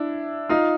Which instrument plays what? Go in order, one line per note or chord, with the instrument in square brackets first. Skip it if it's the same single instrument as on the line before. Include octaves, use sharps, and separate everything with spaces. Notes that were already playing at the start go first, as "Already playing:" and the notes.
Already playing: [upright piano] D4 E4
D#4 F4